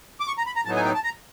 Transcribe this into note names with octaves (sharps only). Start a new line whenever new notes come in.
D6
C#6
A#5
B5
A#5
A2 F#3 B3 D#4 A5
G#5
G5
A5
A#5